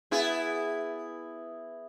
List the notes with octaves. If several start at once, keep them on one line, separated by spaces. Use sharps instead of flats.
B3 E4 G#4